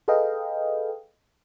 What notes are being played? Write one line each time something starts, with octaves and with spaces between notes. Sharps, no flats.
G#4 A4 B4 D#5 F5 G5